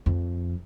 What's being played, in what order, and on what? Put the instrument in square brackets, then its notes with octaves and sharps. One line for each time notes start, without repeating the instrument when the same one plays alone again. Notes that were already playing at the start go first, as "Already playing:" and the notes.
[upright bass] F2